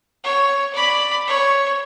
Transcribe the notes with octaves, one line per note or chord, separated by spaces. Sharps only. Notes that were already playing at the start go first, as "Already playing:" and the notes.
C#5
D5 B5
C#5